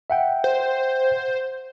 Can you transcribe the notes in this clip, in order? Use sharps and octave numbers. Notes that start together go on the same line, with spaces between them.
E5 F#5 G5
C5